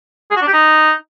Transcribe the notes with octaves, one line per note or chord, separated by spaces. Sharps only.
G#4
F#4
D4
G4
D#4